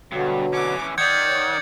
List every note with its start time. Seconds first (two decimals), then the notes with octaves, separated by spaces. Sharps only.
0.12 G2 B2 D3 F#3
0.53 E3 C#4 D6
0.98 D#3 D5 F#5 G6 G#6 C#7
1.28 C#5 F#5